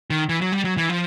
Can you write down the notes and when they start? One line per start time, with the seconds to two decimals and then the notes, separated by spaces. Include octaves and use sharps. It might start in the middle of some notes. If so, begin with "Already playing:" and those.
0.10 D#3
0.29 E3
0.41 F#3
0.52 G3
0.65 F#3
0.77 E3
0.89 F3